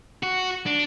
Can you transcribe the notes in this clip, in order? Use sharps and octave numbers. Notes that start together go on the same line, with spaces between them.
F#4
D4